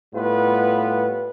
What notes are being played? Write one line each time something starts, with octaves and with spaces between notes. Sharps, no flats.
A2 G3 B3 F4 B4